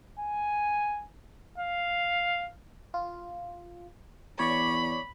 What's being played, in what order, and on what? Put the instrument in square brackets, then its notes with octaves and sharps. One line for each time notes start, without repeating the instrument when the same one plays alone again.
[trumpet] G#5
F5
[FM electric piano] F4
[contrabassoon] E2 [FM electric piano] C#5 D5 C#6 [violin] B5